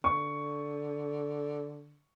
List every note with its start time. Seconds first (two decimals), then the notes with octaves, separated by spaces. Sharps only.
0.04 D3 C#6